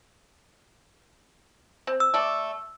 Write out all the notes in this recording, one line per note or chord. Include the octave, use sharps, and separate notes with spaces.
C4
E6
A3 D5